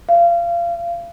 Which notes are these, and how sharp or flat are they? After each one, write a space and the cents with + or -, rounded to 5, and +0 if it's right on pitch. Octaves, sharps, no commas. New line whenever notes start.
F5 -30